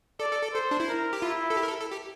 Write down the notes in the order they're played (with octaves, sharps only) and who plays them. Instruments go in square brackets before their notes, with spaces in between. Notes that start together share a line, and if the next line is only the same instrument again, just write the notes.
[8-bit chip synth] A4 [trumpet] D5
[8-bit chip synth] A4
A4
[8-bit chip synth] A4 [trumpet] C5
[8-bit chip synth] D4
E4
[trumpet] A#4
[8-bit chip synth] G4
[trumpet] E4 [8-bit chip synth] F4
[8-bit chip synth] A4
G4
A#4
A4
A4
G4